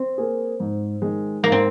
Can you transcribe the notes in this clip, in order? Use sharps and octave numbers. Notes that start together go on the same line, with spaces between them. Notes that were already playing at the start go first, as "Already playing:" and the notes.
Already playing: C4
A#3 G#4
G#2
D#3 G#3
G#2 A#3
C4